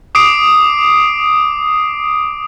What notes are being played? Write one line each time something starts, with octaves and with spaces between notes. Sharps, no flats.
D6 D#6 C7 D7